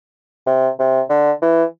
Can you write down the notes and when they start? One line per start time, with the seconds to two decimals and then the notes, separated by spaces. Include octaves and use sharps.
0.47 C3
0.79 C3
1.10 D3
1.42 E3